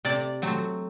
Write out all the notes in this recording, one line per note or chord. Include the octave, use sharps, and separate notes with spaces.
C3 D5
F#3 A3 C4